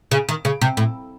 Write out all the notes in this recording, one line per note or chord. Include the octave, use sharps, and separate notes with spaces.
C#3
D#3
C#3
C3
A2